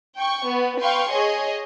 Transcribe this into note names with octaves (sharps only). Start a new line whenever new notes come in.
G5 C#6
B3
B4 F5 G5 C6 C#6
G#4 C#5 D#5